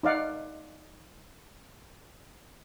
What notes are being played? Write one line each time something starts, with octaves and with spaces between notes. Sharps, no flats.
D#4 D5 F5 F#5